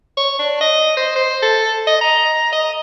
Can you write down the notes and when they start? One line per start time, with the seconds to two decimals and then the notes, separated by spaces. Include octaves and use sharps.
0.17 C#5
0.39 D4
0.61 D#5
0.97 C5
1.16 C5
1.42 A4
1.87 D#5
2.01 A#5
2.53 D#5